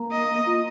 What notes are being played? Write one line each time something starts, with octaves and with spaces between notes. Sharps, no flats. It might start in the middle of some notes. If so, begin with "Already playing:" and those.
Already playing: A#3
D#5
F4